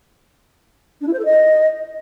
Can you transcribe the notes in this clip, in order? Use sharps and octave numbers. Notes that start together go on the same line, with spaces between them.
D4
E4
C5
A4
D#5